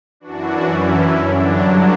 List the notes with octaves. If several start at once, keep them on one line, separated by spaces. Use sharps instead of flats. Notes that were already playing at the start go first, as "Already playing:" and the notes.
F#2 E3 D4 F#4
C#4 E4
G2 D3 F#3 D4